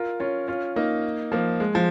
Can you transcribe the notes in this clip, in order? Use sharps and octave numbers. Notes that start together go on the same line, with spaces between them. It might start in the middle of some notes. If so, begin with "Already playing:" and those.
Already playing: F4 A#4
C#4 F4
C#4 F4
A#3 D#4
F3 A#3
G#3
F3